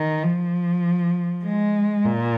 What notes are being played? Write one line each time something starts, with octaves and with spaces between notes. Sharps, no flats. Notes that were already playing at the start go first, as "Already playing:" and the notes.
Already playing: D#3
F3
G#3
A#2